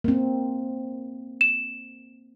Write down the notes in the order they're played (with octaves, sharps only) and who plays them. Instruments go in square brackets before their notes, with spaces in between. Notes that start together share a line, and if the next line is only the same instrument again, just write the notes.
[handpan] A#3 C4
[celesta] E7